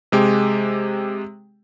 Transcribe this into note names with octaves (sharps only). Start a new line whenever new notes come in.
C3 G#3 G4